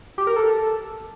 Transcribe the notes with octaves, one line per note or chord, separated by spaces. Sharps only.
G4
A#4
A4